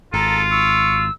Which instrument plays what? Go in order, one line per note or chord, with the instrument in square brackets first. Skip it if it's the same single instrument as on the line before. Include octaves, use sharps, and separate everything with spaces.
[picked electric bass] G#1 [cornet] F4 [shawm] A4 [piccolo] A#5
[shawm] C#6 [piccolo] E6